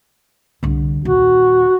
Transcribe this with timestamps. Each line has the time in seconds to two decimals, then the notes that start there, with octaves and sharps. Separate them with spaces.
0.63 C2 D3
1.05 D#1 F#4